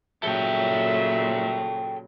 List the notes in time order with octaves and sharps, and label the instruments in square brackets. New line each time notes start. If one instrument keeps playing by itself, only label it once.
[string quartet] A#2 C#3 F#3 [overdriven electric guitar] A4 G5 [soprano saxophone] E5